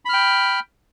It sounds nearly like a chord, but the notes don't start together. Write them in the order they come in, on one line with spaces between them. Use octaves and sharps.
B5 F6 G5